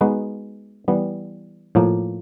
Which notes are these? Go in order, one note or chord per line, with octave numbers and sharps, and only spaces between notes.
G#3 B3 D#4 F#4 B4
E3 G3 B3
A2 F3 A#3